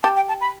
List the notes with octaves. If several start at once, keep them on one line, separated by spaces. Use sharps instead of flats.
G4 A5
G5
A5
B5